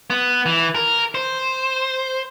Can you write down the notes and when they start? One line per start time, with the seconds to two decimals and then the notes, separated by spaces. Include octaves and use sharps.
0.10 B3
0.46 E3
0.75 A#4
1.15 C5